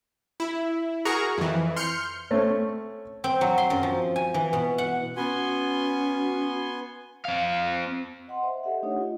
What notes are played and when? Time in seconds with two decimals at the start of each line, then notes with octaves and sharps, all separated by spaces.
0.40 E4
1.05 F#4 G#4 A#4 A#5 C#6
1.38 F2 E3
1.76 C6 F6 G6 C#7
2.31 A3 C4 C#4
3.24 C4
3.41 F#3
3.58 C6
3.70 F#2
3.83 F3
4.16 G#5
4.34 E3
4.53 B2
4.78 F#5
5.17 B3 C#4 F#4 G#5 C6
7.25 C4 F5
8.28 D#5 F#5 C6
8.43 C5 E5
8.63 G4 A4 D#5 E5 F#5
8.82 A3 D4 D#4 G4 C#5 F#5
8.98 F4 D#5